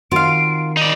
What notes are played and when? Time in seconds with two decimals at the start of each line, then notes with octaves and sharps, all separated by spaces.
0.11 D#3 C4 F4 F#4 F5 D7
0.77 D#4 D5 F7